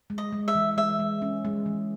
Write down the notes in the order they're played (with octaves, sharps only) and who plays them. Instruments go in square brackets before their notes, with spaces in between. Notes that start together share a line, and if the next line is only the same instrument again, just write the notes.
[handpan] G#3
[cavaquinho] D#5
[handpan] G#3
[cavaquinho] E5
[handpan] E3
[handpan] G#3 [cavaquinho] E5
[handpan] G#3
C#4
G#3
E3